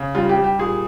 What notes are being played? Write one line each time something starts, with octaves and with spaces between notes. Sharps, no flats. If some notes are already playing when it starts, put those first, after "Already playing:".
Already playing: C#3
G3 F4
G4
G3
G4
A#2 G#4